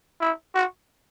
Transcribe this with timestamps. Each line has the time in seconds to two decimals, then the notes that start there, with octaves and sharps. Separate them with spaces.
0.21 E4
0.54 F#4